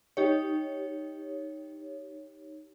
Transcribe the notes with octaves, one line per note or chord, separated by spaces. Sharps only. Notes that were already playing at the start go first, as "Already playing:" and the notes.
D#4 G4 C#5